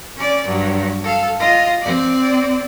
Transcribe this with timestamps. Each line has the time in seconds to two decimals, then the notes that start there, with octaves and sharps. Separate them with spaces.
0.16 C#4 D5
0.46 G2 F#3
1.04 A4 F5
1.39 F4 D#5
1.82 C4 D5